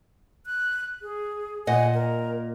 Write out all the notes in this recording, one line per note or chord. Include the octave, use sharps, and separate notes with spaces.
F#6
G#4
A#2 D#5 F#5 G#5
A#4